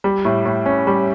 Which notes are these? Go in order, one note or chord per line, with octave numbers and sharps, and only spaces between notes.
G3
A2
A2
C#4
G3